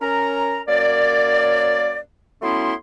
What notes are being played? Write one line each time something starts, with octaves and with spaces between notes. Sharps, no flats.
C#4 A#4 A#5
F#2 A#3 C#5 D5
F#3 A3 B3 C#4 E4 C6